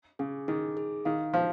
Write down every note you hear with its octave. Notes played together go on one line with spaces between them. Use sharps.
C#3 G#4
D#3 G#4
G#4
D#3 F5
F3 F5